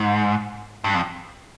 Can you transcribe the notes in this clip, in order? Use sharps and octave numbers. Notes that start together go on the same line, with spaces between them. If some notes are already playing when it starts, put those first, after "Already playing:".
Already playing: G#2
G2
F2